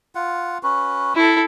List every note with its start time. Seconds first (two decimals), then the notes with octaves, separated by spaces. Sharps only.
0.15 F4 F#5
0.63 C#4 F#4 B4
1.15 E4 A4